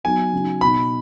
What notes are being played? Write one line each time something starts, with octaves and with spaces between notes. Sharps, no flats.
F#3 B3 D#4 G#5
C#3 F#3 D#4
B2 B3 D#4 B5